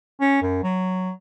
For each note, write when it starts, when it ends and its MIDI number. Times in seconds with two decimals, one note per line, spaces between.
0.21 0.41 61
0.42 0.63 42
0.63 1.11 54